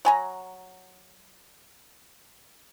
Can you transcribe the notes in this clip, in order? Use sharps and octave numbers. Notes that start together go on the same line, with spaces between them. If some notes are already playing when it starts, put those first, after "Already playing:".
F#3 G#5 A#5